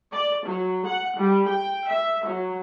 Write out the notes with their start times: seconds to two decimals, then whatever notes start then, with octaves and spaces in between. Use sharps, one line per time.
0.12 D5
0.44 F#3
0.86 F#5
1.18 G3
1.48 G5
1.87 E5
2.26 F#3